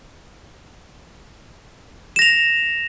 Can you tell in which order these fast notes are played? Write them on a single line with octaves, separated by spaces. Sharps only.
E7 A#6 F7